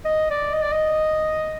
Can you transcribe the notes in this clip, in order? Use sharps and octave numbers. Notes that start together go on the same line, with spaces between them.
D#5
D5
D#5
D5
D#5